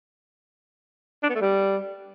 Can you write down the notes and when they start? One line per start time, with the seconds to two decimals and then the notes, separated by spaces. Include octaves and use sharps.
1.23 D4
1.29 B3
1.35 A3
1.41 G3